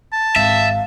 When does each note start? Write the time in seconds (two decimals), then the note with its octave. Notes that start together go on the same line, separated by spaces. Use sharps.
0.13 A5
0.36 G#1 E5 F5